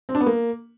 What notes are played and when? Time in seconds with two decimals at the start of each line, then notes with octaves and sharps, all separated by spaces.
0.09 C4
0.15 D4
0.21 B3
0.26 A#3